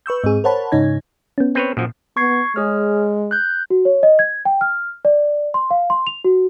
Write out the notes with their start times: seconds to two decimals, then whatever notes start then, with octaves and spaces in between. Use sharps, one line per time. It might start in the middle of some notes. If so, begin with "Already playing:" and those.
0.06 B4 C#6 E6 G6
0.24 G#2 C4 G#4
0.44 A#4 C5 C#5 F#5 A5 B5
0.72 G#2 C#3 D#4 C#5 G#6
1.38 B3 C#4
1.55 C4 B4 C#5
1.77 F#2 A#2 F3
2.17 B3 C#6 G#6 C7
2.56 G#3 G#4 C#5 F6
3.31 F#6 G6
3.70 F#4
3.85 C#5
4.03 D#5
4.19 G#6
4.45 G5
4.61 F6
5.05 D5
5.54 C6
5.71 F5
5.90 C6
6.07 F7
6.24 F#4